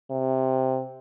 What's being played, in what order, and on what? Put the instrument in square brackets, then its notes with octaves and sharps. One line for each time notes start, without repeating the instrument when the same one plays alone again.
[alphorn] C3